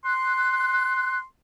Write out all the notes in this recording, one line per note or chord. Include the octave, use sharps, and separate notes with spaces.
C6 F#6